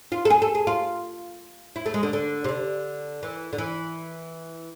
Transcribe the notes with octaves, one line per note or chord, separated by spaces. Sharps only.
F4
A4
G#4
A4
G#4
F4
E4
A3
G#3
D3
D3
C3
D3
E3
D3
E3